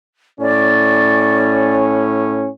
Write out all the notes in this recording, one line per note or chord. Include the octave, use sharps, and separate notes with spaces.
A2 C#4 D5